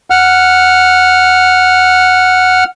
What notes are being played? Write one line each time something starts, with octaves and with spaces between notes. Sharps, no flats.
F#5 F6